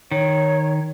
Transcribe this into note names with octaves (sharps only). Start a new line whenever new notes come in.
D#3 C#5